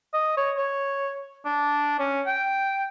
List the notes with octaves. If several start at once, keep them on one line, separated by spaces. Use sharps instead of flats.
D#5
C#5
C#5
D4
C#4
G5